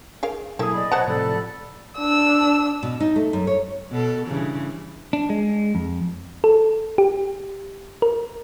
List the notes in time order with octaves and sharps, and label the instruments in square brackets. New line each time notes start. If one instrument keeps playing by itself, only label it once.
[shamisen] G#4 A#4 F5
[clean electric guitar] B1 G#4 [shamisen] A#3 E4 A4
[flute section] D5 D#5 B5
[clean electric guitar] B1 C#5 F#5 [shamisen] C5 A5 A#5
[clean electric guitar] A2 C3 F3 [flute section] A4 D5 B5
[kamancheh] D4 E6
[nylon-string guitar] B2
D#4
A3
F#2
C#5
[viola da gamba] B2 A4
G2 C#3 E3
[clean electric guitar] D4
G#3
F2
[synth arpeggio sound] A4
G4
A#4